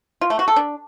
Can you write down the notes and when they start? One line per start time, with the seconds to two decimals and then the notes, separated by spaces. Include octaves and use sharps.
0.21 F4
0.30 A3
0.39 F#4
0.48 A4
0.56 D4